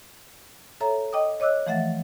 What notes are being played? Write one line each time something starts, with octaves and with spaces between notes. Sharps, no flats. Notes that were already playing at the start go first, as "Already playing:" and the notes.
A4 C#5 E5 A#5
D#5 G5 D6 D#6
C#5 D#5 D6 E6 F#6
E3 F3 A3 E5 F#5 A6